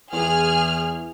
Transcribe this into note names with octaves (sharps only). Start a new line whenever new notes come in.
E2 G#4 F6